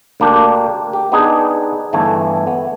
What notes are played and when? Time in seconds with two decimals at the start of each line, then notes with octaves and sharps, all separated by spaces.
0.20 D2 A#3 D4 G4
0.93 G4
1.12 B3 D4 D#4 G#4
1.93 G1 E3 A3 G#5
2.47 B3